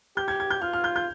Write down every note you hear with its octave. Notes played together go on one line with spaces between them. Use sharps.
G4 G6
G#6
G#6
G6
F4 F6
F6
G6
G6